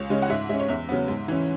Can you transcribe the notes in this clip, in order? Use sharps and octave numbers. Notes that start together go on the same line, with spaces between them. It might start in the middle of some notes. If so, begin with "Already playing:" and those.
Already playing: C#2 C#5
C#3 G#3 C#4
F#5
G#2 E5
G#3 C#4 E5
C#5
E2 E5
C#3 F#3 B3
G#2
E3 C#4